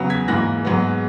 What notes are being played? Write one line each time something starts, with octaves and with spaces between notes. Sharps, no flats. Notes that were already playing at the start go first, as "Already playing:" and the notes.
Already playing: E2 C#3 F#3 B3
G#6 B6
G#2 E3 A#3 F#6 A#6
G#2 F#3 B3